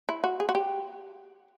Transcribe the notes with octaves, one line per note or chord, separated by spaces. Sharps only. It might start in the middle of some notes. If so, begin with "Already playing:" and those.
E4
F#4
G#4
F#4
G4